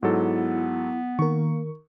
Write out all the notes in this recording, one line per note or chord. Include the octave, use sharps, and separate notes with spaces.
G#2 F#3 B3 E4 A4
D#3 A#3 A#4 C#6